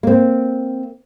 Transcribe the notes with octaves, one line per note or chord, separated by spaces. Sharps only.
A#3 C4